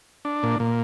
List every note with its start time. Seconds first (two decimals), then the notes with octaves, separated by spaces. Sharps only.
0.25 D4
0.43 A#2
0.60 A#2